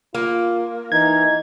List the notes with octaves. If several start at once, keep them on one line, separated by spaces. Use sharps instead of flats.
A#3 F4
E3 D#4 G#6